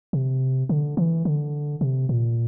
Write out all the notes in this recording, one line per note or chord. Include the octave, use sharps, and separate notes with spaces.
C3
D3
E3
D3
C3
A#2